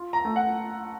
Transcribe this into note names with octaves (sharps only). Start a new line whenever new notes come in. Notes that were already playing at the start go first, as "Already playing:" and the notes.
Already playing: F4
A#5
A3
F#5